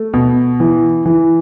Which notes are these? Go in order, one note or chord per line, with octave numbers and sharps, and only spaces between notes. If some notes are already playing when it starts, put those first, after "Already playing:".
Already playing: A3
B2
E3
E3